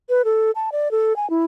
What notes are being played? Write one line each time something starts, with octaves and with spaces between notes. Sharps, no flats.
B4
A4
A5
D5
A4
G#5
E4